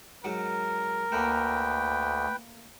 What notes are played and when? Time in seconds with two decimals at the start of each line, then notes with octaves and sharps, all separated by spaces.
0.24 G#2 F#3 A#4
1.12 D2 A3 A#3 B4 G5